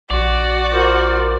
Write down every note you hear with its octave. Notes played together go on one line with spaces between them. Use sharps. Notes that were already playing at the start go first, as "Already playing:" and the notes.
A#1 F#4 D5
F4 A#4 C5